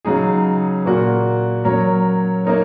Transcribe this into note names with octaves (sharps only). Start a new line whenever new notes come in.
C#3 F#3 D#4 G#4
A#2 A#3 F#4
F#3 C#4 A#4 C#5
A#3 D#4 A#4 C#5